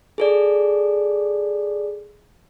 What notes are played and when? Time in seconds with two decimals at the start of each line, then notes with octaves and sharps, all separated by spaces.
0.18 G#4 A4 D5